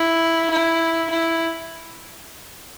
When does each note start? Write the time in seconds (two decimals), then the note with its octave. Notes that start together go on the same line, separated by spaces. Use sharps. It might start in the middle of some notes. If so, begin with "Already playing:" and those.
Already playing: E4
0.51 E4
1.10 E4